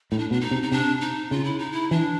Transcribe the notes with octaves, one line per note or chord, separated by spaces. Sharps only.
A2 D#4
D4
B2 D4
D#4
C3
D#4
C3 D4
D#4
C#3 F4
E4
D#4
E4
E3 D4